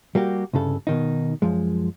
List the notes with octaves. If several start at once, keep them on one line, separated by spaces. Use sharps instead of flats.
G3 A#3 F#4 G4
C2 G2 C#3 A4
B2 D#3 D#4
F#2 F3 G#3